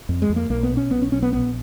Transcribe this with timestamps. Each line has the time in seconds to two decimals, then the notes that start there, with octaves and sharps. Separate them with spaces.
0.09 F2
0.22 G#3
0.29 F2
0.36 A#3
0.50 B1 A#3
0.63 B3
0.71 B2
0.77 C#4
0.91 B1 B3
1.02 C#4
1.12 B1 C#4
1.23 B3
1.33 A#1 B3